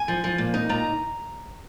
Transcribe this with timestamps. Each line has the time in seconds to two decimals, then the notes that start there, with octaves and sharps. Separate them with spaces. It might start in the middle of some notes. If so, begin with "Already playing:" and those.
Already playing: G#5
0.08 F3
0.24 F3
0.38 A#2
0.54 D#4
0.69 A#2 A#5